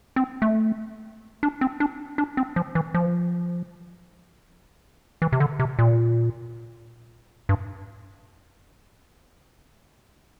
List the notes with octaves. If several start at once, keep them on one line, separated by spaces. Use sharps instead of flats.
C4
A3
D4
C4
D4
D4
C4
F3
E3
F3
E3
C3
D3
C3
A#2
G2